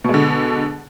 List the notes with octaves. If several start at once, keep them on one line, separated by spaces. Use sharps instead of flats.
B2 D3 G#3